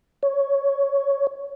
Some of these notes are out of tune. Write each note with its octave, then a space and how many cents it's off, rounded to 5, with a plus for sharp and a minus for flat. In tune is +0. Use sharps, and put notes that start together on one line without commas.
C#5 +5